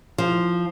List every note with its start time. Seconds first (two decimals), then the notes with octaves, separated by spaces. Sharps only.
0.18 F3